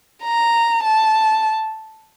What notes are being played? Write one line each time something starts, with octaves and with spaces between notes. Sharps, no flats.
A#5
A5